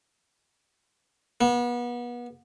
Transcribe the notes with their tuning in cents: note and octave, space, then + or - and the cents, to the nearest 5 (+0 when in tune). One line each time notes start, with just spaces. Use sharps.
B3 -35